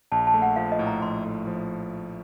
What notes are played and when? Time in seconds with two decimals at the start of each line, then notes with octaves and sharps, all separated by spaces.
0.12 A#1 A5
0.27 A5
0.34 A3
0.42 F#5
0.56 F3 F5
0.72 D#5
0.79 A2
0.87 A#5
1.02 A#1 C6
1.25 A2
1.47 F3